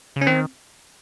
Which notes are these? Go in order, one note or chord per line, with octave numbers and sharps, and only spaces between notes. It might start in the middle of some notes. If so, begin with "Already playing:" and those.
C#3
C#4
D#3 C4